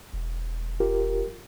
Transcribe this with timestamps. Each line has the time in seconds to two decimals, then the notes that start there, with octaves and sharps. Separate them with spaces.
0.14 E1
0.80 F4 G4 A#4